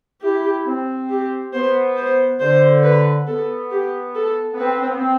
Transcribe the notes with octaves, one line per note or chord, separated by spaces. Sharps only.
E4 G4
C4
G4
B3 C5
C5
D3 C5
B4
B3 A4
G4
A4
B3
C4 B4
C4
B3
C4